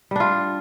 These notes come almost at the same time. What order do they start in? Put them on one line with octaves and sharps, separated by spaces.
G3 D4 F4